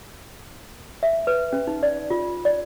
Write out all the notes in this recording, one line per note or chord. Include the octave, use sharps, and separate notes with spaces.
E5
B4
C#4
D#4
D5
F4
D5